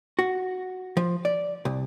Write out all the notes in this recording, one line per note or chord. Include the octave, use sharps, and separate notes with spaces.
F#4
F3
D5
C2